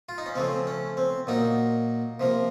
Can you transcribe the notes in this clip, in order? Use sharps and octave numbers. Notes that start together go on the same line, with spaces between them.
F4
D#4
C#4
C#3 F3 A3 C4
C#4
C4
A#2 F#3 A#3 D#4
C3 F3 A#3